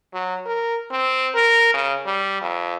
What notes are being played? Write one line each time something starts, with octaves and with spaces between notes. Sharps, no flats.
F#3
A#4
C4
A#4
C#3
G3
F2